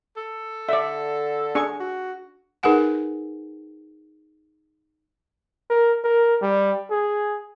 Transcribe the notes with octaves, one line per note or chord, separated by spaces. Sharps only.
A4
D3 D5 E5
D4 G#4 C#6
F#4
D#4 G#4 A#4 B4 F#5 G#5
A#4
A#4
G3
G#4